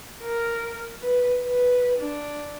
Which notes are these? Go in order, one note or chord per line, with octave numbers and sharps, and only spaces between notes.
A#4
B4
B4
D4